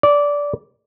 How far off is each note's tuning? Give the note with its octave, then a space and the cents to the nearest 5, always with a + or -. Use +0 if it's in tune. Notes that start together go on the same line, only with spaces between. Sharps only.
D5 -15